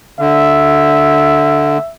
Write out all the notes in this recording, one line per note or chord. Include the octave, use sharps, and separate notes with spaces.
D3 E5